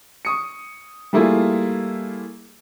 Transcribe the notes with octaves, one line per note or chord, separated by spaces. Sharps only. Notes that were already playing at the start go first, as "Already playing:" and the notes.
C#6 D#6 C#7
G3 A3 A#3 E4 F4 G#4